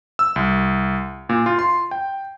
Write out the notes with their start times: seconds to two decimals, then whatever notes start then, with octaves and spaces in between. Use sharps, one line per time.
0.19 E6
0.36 C2
1.29 A#2
1.46 F4
1.59 C6
1.91 G5